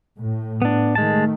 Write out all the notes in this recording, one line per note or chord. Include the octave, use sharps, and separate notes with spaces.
A2
B3 D4
D#3 G#3 A3 A5